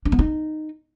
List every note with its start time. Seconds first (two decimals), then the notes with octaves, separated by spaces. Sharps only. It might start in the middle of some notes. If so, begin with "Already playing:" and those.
0.05 D4
0.12 B3
0.19 D#4